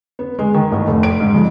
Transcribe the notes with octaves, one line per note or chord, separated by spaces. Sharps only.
B3
G#3
D#3
A1
F1
D7
G#2
F2